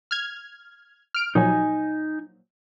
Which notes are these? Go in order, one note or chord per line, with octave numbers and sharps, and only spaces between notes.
F6 G#6
F6 D7
A#2 F3 F#3 D#4 G#5